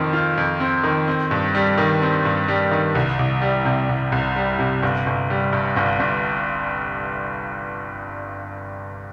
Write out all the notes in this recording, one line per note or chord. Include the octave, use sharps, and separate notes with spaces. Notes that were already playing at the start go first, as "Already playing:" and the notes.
Already playing: F2 D#3 C4 F4
F4
F2
C4
D#3
C4
G2
G3
D#3
C4
G2
G3
D#3
C2
C2
G3
C3
C2
C2
G3
C3
G1
G1
G3
G2
G1
G1